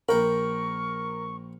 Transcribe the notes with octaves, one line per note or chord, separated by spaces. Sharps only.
A#1 A#4 G5 B5 C#6